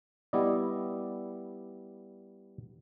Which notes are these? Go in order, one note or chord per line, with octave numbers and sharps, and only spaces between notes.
G3 B3 E4 D5 D#5